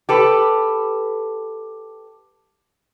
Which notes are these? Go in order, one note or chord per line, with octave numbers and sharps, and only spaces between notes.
G4 A4 B4